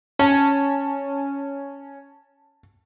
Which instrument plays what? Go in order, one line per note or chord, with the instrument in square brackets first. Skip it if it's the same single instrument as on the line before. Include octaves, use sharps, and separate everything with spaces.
[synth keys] C#4 [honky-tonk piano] A5